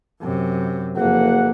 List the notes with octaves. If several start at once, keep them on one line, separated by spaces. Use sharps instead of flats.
F#2 C3
F#1 F2 A#3 F#5